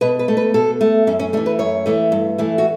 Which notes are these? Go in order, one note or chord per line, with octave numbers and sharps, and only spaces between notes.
B2 B4
B4
A3
B4
B2 A4
A3
F#2 C#4
C#4
E3 A3 D4
B4
F#2 C#5
E3 A3
G2
E3 A3
F#4